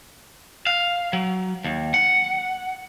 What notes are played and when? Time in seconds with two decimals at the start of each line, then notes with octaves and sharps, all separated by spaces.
0.67 F5
1.13 F#3
1.64 D#2
1.94 F#5